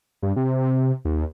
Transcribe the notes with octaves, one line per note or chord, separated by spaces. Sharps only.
G2
C3
D#2